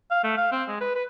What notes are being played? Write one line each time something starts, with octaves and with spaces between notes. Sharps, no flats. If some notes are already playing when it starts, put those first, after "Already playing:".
F5
A3
F5
C4
G#3
B4
B4